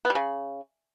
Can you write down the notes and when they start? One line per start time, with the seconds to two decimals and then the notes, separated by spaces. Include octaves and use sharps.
0.05 B3
0.10 G3
0.15 C#3